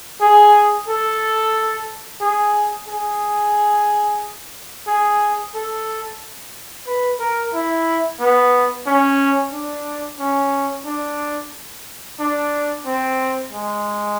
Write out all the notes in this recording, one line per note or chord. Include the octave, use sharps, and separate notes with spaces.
G#4
A4
G#4
G#4
G#4
A4
B4
A#4
E4
B3
C#4
D4
C#4
D4
D4
C4
G#3